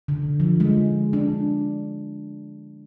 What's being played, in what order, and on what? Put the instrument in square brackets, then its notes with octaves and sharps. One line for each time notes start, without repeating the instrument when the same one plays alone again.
[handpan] D3
F3
G#3
D4